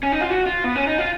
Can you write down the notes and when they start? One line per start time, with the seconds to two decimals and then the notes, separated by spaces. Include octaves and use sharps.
0.03 C#4
0.12 D#4
0.21 F4
0.30 F#4
0.46 F4
0.64 B3
0.76 C#4
0.87 D#4
0.98 F4